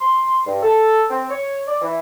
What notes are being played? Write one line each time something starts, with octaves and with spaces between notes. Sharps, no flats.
C6
G2
A4
C4
C#5
D5
E3